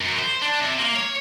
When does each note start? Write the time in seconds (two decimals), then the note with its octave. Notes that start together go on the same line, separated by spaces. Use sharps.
0.01 F#2
0.19 C5
0.42 D4
0.61 C3
0.79 A#3
0.96 C#5